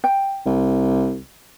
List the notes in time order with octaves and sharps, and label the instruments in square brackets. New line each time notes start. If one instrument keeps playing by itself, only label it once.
[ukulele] G5
[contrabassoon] C2